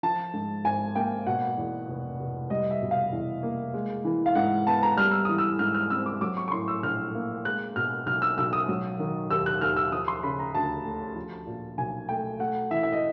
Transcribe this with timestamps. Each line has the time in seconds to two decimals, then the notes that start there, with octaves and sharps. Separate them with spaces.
0.03 F3 A5
0.34 G#2
0.65 G#1 G#5
0.95 A#3 G5
1.26 B2 F#5
1.58 E2
1.88 F1
2.20 F1
2.50 G3 D#5
2.71 E5
2.82 B2
2.91 F5
3.12 E2
3.43 A#3
3.74 G#3
4.05 E3
4.26 F5
4.35 G#2 F#5
4.67 B3 A5
4.83 A#5
4.97 G3 F6
5.12 E6
5.25 E3 D#6
5.38 E6
5.59 G#2 F6
5.74 F6
5.90 C4 E6
6.06 D6
6.21 F#3 D6
6.37 C#6
6.48 C#6
6.52 A2 C6
6.68 E6
6.83 A#1 F6
7.15 A#3
7.45 G#3 F#6
7.76 B2 F6
8.06 B1 F6
8.22 E6
8.38 B1 E6
8.53 D#6
8.68 F#3
8.99 D#3
9.30 D#2 E6
9.46 F#6
9.61 D#2 F6
9.76 E6
9.92 F3 D#6
10.08 C6
10.23 C#3 B5
10.39 A#5
10.55 D2 A5
10.85 A3
11.16 F3
11.47 A#2
11.78 B1 G#5
12.09 A3 G5
12.39 A3 F#5
12.71 E3 E5
12.83 E5
12.92 D#5